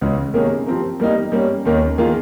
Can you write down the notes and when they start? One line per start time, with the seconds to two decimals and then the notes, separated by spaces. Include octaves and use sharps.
0.01 C#2 C#3 G#3
0.34 C3 D#3 A#3 C#4 G#4
0.66 F3 C4 G4 A#4
1.00 G3 A#3 D#4
1.32 G3 A#3 C#4
1.65 D#2 D#3 A#3 C#4
1.98 D#3 A#3 F4 G#4